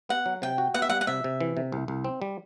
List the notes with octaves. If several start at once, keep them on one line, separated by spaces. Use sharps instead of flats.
B3 F#5
F#3
C3 G5
F#4
B3 F#5
E5
G3 F#5
F#5
C3 E5
C3
E3
C3
C2
C2
C4
G3